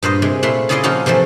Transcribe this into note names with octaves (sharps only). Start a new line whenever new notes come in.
G2 A#2 C5 D#5
C3 G#3
A#2 A3 E4 C6
C#3 E4 G#4 D5 D#5 C6
F3 A#3 C#4 D#4 F4 F#4
C3 E3 F3 A3